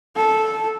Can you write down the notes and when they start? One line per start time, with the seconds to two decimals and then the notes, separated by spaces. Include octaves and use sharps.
0.16 A4